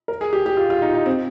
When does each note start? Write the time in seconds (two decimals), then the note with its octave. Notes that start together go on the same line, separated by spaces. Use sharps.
0.08 A#4
0.21 G#4
0.33 G4
0.46 G4
0.57 F4
0.70 F4
0.82 D#4
0.95 D#4
1.06 C4